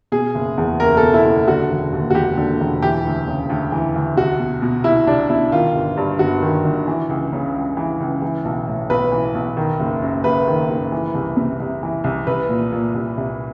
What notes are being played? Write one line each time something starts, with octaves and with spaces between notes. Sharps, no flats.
B2 G#4
F#1
E2
F#1 A#4
A4
B2
E4
F#1
D3 F#4
E1
D#2
F#4
E1 G4
D3
E1
E3 G4
D2
C#3
D2
E3
D2
C2 F#4
B2
B2
C2 E4
C2 D4
B2 E4
D#3 F4
G1
G2
G1 F#4
D#3
G1
E3
C#2
C#3
C#2
E3
C#2
E3
B1
A2
B1 B4
E3
B1
D#3
F#1
F#2
F#1 B4
D#3
F#1
E3
C2
C3
C2
E3
C2
C2 B4
A#2
A#2
C2
C2